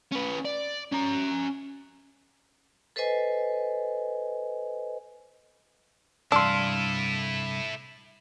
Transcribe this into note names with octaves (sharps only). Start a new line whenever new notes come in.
C#4 B4
D5
C#4 A#5
A4 B4 C5 D#5 G#5
C2 G2 D4 E4 A4 F5 C6 E6